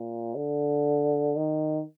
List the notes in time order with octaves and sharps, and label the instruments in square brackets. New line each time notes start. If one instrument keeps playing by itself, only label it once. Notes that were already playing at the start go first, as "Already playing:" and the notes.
Already playing: [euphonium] A#2
D3
D#3